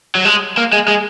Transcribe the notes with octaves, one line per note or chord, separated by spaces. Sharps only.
F#3
G#3
A#3
G#3
G#3